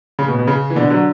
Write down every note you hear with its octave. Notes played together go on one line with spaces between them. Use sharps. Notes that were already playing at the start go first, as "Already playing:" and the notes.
C#3
B2
B2
C#3
E3
B2 D3
D3 F#3